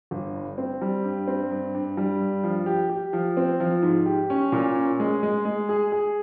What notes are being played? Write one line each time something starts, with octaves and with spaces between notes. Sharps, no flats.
G1
G2
C4
G3
G2
C4
G2
G2
G3
G2
F3
G4
G4
F3
C4
F3
G#2
G4
C#4
A#2
C#4
G#3
G#3
G#3
G#4
G#4